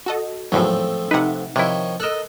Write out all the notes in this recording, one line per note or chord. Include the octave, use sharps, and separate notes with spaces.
F#4 A4 D#5
G#1 E2 A2 F3 F#3 A3 C4
C3 D#4 B4 E5 F#5
C3 D#3 F3 E4 C#5
A4 A#4 D#5 E6 F#6